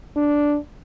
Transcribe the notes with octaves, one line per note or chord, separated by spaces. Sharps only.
D4